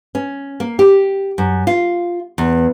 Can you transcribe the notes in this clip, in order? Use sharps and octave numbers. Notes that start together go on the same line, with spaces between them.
C#4
A#3
G4
F#2
F4
E2